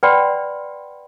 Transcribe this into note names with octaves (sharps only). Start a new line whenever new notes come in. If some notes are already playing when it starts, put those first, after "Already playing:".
B4 D5 F#5 G5 B5 C6